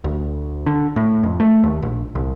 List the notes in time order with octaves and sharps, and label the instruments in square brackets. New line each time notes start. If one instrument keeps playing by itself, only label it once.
[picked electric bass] D2
D3
A2
F2
A3
D#2
A#1
C2